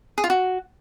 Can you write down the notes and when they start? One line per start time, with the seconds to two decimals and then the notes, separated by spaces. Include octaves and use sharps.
0.18 G#4
0.24 F4
0.30 F#4